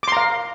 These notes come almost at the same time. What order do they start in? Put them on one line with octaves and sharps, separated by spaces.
D6 C6 A#5 F5